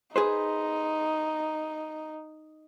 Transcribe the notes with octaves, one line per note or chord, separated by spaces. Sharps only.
D#4 G#4 B4 C5